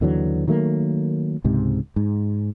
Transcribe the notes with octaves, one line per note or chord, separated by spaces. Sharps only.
D#2 D3 E3 F#3
D#3 F#3 A3 A#3
C#2 G#2 C3
G#2